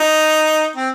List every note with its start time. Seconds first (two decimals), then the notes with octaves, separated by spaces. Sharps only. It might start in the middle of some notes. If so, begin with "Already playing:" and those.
Already playing: D#4
0.76 C4